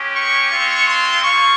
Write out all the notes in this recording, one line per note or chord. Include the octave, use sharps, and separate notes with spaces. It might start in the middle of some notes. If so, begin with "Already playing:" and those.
Already playing: G#3 C#4 G4
C#6
G#3 C4 F4
C6
A#3 F4 C#6